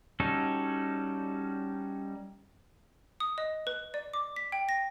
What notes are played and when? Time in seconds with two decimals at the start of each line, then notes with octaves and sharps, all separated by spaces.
0.20 G3 C#4 D#4 F#4 A4
3.20 D#6
3.38 D#5
3.67 B4
3.94 D5
4.14 D6
4.36 B6
4.52 G5
4.69 A#6